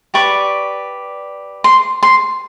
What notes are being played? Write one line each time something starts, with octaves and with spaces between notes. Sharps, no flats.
G4 B4 D5 C#6
C6
C6